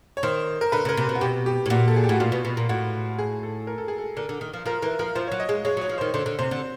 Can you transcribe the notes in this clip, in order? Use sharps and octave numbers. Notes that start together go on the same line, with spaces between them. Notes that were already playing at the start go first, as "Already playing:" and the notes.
C#5
D#3 C5
A#4
D3 B4
C#3 A#4
C3
B2
F#4
B2 G4
G4
A2
A#2 F#4
A4
G#4
G4
A2 F#4
A#2 F4
B2
B2
A#2
A2 F#4
G#4
A4
A#4
A4
G#4
A4
D3 A#4
D3
D#3
F3
F3 A#4
E3 A#4
F3 A#4
F3 C5
C#5
F#3
D#5
G#3
G#3 C#5
F#3
C#5
F3
C5
D#3
D3 C5
D3
C3 C5
D3